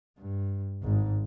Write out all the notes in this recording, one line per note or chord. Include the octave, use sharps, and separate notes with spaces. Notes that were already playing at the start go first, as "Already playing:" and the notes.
G2
G#1 G#2